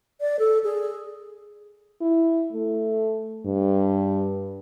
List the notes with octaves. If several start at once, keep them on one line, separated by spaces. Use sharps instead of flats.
D5
A4
G#4
E4
A3
G2